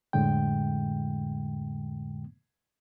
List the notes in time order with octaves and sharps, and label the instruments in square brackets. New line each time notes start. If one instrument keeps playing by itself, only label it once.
[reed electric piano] F2 A2 D3 G#3 G5